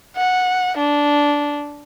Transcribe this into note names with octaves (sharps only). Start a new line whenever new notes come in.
F#5
D4